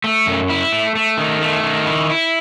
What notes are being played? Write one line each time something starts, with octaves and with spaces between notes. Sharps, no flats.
A3
F#2
E4
A3
A3
D#3
A3
D#3
E4
E4